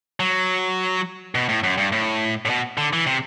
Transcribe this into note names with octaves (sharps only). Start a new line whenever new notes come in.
F#3
B2
A2
F#2
G2
A2
A2
B2
D3
E3
C3